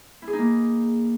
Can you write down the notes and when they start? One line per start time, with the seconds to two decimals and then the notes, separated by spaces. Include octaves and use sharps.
0.22 E4
0.28 G#4
0.33 D#4
0.38 A#3